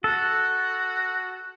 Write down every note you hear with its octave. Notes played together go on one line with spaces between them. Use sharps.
F#4 A4